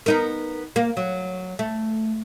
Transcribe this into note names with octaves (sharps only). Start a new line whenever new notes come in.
B3 D#4 A#4
A#3
F#3
A3